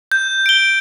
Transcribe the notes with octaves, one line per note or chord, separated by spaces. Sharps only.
G6
D7 G7